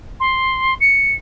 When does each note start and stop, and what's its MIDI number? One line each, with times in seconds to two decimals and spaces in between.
0.20 0.75 84
0.81 1.16 97